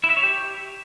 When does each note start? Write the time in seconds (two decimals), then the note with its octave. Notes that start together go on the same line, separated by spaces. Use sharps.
0.04 E4
0.10 E5
0.17 C#5
0.23 G4